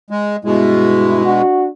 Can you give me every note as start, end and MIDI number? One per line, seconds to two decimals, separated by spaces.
0.11 0.36 56
0.45 1.22 43
0.45 1.42 47
0.45 1.42 56
0.45 1.22 64
1.26 1.68 62
1.26 1.68 66